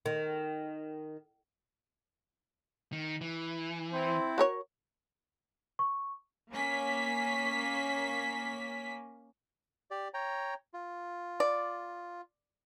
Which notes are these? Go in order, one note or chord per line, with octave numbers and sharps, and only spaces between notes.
D#3
D#3
E3
C4 E4 C5
F#4 A#4 C#5
C#6
A#3 C#4 B6
G4 D5
C#5 G5 A#5
F4
D5